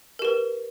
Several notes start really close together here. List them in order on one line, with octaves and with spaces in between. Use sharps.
A#4 G4 B4